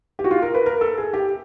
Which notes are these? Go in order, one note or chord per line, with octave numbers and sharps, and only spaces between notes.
G4
F#4
F4
A#4
B4
A#4
A4
G#4
G4